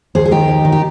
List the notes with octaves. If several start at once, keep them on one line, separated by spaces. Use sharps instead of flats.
D#2 G#4 C5
G#4
D#3 D#4 G4
D#2
D#3
G4